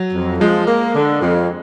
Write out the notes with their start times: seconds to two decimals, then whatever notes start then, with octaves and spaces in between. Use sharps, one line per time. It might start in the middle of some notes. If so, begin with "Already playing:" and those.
Already playing: F#3
0.13 F2
0.40 F3 G#3
0.67 A#3
0.95 D3
1.21 F2